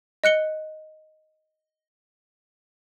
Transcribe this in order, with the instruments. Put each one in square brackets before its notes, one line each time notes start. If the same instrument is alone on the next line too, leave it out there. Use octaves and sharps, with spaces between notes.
[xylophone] D#5 F#6 C#7 G7